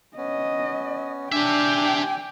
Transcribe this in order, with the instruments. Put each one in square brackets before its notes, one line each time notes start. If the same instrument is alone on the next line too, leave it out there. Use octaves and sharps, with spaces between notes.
[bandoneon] B3 C#4 [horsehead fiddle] D#5
[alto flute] D4 [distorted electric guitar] G4 E5 [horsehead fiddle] G5 [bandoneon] G#5 D6